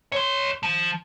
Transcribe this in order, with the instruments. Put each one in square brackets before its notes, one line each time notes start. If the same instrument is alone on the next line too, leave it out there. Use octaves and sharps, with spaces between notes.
[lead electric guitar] C#5 C6
F3